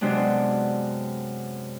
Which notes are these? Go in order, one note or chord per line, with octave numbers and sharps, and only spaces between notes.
F#2 C3 G#3 B3 D4